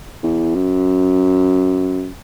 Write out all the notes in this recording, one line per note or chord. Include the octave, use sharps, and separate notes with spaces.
E2
F#2